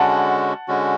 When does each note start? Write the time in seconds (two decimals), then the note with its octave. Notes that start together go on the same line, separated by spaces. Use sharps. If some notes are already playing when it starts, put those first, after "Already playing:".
Already playing: D3 G#3 C#4 F#4 F#5 A5
0.68 D3 G#3 C#4 F#4